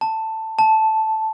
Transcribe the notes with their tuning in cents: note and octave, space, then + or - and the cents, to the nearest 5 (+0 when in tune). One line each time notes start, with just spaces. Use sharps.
A5 +10
A5 -5